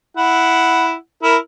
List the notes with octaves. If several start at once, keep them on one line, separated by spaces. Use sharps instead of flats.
E4 F#5
E4 A#4